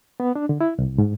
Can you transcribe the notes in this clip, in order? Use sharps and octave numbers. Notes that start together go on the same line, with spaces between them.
B3
D4
D3
E4
C2
G#2